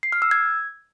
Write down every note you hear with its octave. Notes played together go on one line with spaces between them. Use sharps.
C7
F6
E6
G#6